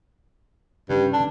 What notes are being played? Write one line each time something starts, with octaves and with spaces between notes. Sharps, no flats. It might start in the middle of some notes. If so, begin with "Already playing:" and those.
G2 C#3
D4